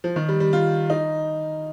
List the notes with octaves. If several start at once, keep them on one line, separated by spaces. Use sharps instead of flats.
F3
D#3
G3
G3
F4
D#4